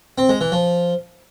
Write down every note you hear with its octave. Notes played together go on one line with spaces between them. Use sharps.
C4
G#3
E3
F3